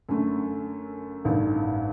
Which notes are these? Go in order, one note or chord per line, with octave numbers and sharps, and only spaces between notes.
F#2 D3 A3
A1 G2 D#3